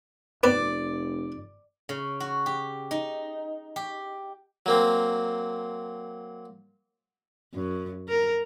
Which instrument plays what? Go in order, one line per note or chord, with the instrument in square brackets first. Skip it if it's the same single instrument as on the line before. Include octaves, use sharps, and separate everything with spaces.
[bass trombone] F1 [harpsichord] B3 C4 B4 [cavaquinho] D5
[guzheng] C#3
F#4
G4
D#4
G4
[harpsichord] F#3 A#3 C4
[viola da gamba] F#2
A#4